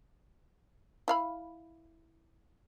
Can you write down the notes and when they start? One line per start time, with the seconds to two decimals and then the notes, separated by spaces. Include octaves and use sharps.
1.08 E4 F5 B5